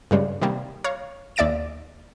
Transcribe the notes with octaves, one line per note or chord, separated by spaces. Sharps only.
G2 C#3 G3 G#3
C3 D#3 G3 A#3
C#5 F5 A#5
D#2 D5 E5 A6 D7 E7